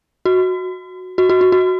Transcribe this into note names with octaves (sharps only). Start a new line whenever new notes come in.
F#4
F#4
F#4
F#4
F#4